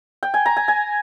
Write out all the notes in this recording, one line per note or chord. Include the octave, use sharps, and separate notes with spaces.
G5
G#5
A#5
G#5
G#5